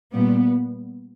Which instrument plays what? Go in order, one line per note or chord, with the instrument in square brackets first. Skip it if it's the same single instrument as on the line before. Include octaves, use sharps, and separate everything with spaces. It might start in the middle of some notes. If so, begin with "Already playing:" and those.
[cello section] A#2 G3 B3